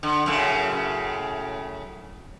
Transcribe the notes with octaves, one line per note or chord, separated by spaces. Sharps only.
D3
F#2 A2 C#3